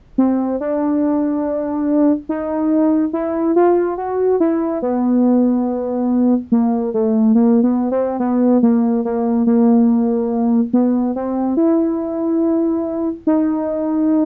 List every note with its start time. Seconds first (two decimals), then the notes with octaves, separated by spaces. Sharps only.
0.18 C4
0.61 D4
2.29 D#4
3.13 E4
3.56 F4
3.98 F#4
4.40 E4
4.82 B3
6.52 A#3
6.94 A3
7.35 A#3
7.63 B3
7.91 C4
8.20 B3
8.63 A#3
9.05 A#3
9.47 A#3
10.73 B3
11.16 C4
11.57 E4
13.27 D#4